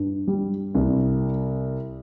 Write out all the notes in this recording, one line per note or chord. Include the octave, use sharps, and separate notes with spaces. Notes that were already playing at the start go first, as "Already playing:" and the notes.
Already playing: G2 D4
G3
C2